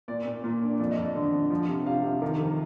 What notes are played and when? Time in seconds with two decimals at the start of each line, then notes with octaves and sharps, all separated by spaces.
0.08 A#2 D5
0.26 A#2
0.44 A#2
0.62 D4
0.79 F2 D5
0.92 D#5
0.97 F2
1.03 D5
1.15 D3
1.33 D3
1.50 F3
1.69 C3
1.86 C3 F5
2.04 C3
2.22 D#3
2.40 F2